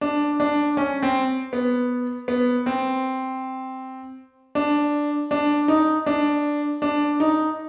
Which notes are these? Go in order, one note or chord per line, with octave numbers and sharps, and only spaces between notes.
D4
D4
C#4
C4
B3
B3
C4
D4
D4
D#4
D4
D4
D#4